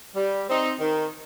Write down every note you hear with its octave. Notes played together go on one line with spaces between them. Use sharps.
G3
C4 D#4
D#3